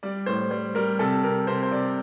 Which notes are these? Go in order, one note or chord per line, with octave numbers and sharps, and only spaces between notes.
G3 D5
A2 C5
G3 C5
G3 A#4
C3 A4
C3 A#4
C3 C5
C5
C3 D5